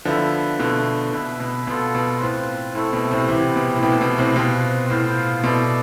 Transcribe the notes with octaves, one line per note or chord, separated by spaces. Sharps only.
D3 F3 B3 E4 B4 E5
B2 D3 A3 E4 B4
B2 B3 E4 B4 E5
B2
B2 B3 F4 A4
B2
A2 C4 F4 B4
A2 A3 C4 E4 A4
B2
A2 C3
C3 E3 B3 E4 G4
B2
A2
B2 B3 E4 G4
A2
B2
A2 C3
B2 C4 F4 B4
A2 B3 F4 C5 F5
B2 E4 A4 D5